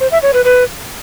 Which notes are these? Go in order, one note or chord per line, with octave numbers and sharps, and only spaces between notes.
C5
E5
C#5
B4
B4